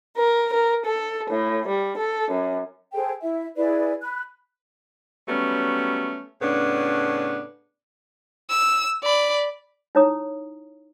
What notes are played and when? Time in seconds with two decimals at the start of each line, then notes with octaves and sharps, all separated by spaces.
0.16 A#4
0.52 A#4
0.86 A4
1.30 A2
1.67 G3
1.98 A4
2.32 F#2
2.93 G#4 A4 C5 G5
3.23 E4 E5
3.56 E4 G#4 B4 D5
4.01 B5 F#6
5.29 F#3 G3 A3 B3 C#4
6.42 A2 C#3 B3 C#4 D4
8.50 E6
9.03 D5 B5
9.95 D#4 E4 C#5 A#5 D#6